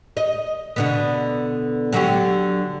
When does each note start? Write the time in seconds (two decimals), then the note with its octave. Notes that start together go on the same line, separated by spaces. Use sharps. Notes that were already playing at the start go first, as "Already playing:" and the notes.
0.17 D#5
0.76 B2 D3 B3
1.92 D3 F#3 G4